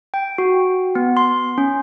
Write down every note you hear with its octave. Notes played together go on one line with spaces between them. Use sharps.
G5
F#4
B3
C6
C#4